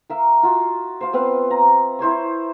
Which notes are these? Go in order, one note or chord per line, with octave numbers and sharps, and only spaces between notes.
A#4 E5 F5
F4 F#4
C5 F5
B3 C4 B4 F5
A#5
E4 C5 C#5 C#6